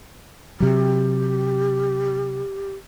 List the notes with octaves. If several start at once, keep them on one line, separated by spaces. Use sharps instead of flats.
C3 F#3 G4